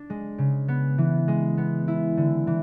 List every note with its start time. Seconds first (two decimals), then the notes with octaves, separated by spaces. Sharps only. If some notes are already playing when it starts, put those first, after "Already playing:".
Already playing: D4
0.10 G#3
0.38 C#3
0.68 B3
0.98 E3
1.28 G#3
1.58 B3
1.88 E4
2.17 D3
2.47 E3